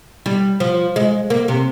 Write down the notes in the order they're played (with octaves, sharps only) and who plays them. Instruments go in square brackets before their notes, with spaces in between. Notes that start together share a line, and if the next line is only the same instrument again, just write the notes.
[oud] G3
F3
G#3
A#3
C3